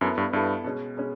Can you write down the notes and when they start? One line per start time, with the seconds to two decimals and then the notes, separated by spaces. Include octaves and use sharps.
0.01 F#2 B3 E4 A4
0.18 G2
0.33 G2 B3 E4 A4
0.64 B2 G#3 C#4
0.97 B2 G#3 C#4